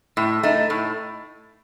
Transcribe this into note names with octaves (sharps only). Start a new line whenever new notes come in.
A2
A3 D#4
A2